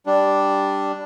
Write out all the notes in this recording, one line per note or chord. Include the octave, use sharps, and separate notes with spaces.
G3 D4